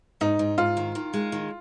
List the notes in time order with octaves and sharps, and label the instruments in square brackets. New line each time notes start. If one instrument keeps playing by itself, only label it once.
[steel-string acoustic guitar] G#2 [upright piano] D#4
[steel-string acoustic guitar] G#2
[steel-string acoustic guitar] G#2 [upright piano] F4
[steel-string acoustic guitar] D#3
D#3
G#3
D#3